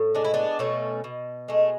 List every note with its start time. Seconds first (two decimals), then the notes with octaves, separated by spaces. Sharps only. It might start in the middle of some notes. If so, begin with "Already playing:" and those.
Already playing: A2
0.15 G#3 D4
0.24 E4
0.34 B3 D4
0.59 B2 A3 C#4
1.04 B2
1.48 G#3 A3